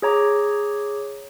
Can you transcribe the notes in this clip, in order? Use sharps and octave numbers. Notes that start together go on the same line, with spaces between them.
G#4 C#5 A#5 D6